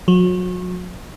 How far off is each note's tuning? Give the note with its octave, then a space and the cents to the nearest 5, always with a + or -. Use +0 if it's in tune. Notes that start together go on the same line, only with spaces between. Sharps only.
F#3 -35